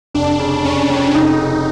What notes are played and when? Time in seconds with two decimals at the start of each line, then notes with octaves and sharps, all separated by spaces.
0.14 F1 D4
0.40 C#3
0.64 F1 C#4
0.90 F2
1.15 F1 D#4
1.40 C#3